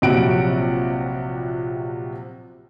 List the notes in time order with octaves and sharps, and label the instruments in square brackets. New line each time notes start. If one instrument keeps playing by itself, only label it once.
[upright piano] A#1 C3 F3 F#3 F#5 D7